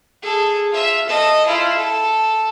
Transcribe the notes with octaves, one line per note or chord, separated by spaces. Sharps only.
G#4 A4
F4 E5
A4 D#5
E4 F4
A4